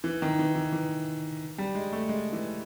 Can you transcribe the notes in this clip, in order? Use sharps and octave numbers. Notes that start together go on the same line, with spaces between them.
E3
D#3
E3
E3
E3
G3
G#3
A3
G#3
E3